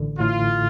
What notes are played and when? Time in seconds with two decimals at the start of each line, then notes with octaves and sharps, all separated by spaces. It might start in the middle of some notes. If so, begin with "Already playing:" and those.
Already playing: A1 D3
0.19 A2 F4